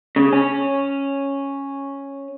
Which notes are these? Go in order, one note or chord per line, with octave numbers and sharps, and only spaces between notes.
C#3
C#4